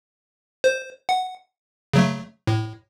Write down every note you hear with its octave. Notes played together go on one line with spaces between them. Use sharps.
C5
F#5
C#3 F#3 A3
A2